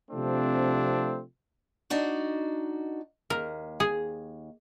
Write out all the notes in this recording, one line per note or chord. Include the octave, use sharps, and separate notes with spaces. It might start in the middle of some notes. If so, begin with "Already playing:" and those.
C3 F3 A3 C4 D4
D4 D#4 F#4
D#2 A#4
G#4